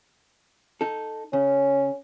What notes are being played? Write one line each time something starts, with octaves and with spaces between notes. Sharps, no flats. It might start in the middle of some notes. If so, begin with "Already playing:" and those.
D#4 A4
C#3 C#4